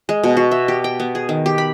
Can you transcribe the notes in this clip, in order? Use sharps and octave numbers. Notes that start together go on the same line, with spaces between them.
G#3
B2
F#4
E5
G4
G5
B3
G#4
D#3
G4
B5